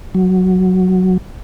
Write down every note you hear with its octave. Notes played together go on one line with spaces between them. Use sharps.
F#3